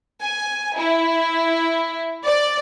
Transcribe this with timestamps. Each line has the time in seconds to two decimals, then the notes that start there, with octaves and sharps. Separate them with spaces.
0.21 G#5
0.76 E4
2.24 D5